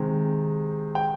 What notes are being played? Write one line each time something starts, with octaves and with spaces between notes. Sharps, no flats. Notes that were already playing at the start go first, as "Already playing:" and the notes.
Already playing: C3 D#3 G#3 C4
G5